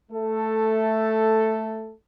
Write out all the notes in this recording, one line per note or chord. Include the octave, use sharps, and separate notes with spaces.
A3 A4